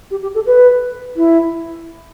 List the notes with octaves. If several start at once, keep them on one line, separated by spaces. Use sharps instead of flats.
G4
G4
A4
B4
E4